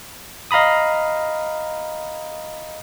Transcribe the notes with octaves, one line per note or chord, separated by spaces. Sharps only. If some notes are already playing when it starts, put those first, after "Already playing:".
D#5 F5 A#5 B5 D#6